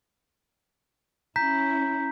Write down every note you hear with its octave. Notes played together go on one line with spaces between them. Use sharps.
C#4 E4 A#5 G6 B6